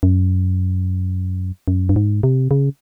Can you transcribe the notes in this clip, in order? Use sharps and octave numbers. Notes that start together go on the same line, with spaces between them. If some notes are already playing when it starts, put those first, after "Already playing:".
F#2
F#2
G2
G#2
C3
C#3